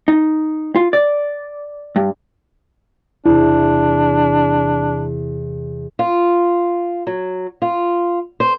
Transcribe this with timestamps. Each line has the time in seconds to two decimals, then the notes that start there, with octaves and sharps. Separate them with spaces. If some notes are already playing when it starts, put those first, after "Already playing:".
0.08 D#4
0.76 F4
0.93 D5
1.96 G2
3.25 E2 C3 D4 E4
5.99 F4
7.07 F#3
7.62 F4
8.40 C5